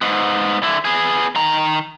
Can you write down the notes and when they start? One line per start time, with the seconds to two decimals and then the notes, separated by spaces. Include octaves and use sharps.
0.01 G#2 B3
0.63 D3 E4
0.85 B3 G#4
1.35 D#3 A#5